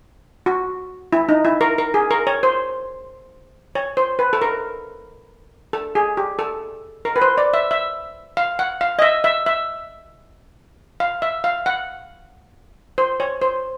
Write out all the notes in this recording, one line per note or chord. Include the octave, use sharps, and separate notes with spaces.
F#4
E4
D#4
E4
A#4
A#4
G#4
A#4
C#5
C5
C#5
C5
B4
A4
A#4
A4
G#4
G4
A4
A#4
B4
C5
D5
E5
E5
F5
F#5
F5
D#5
E5
E5
E5
F5
E5
F5
F#5
C5
C#5
C5